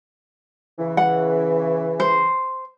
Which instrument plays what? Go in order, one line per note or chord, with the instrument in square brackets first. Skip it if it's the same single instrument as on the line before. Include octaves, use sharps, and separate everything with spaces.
[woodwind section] C#3 E3
[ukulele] F#5
C5